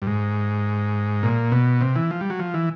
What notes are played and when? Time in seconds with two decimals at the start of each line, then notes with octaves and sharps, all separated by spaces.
0.02 G2
0.07 G#2
1.23 A#2
1.52 B2
1.81 C3
1.96 E3
2.11 F3
2.21 G3
2.30 F#3
2.39 F3
2.54 E3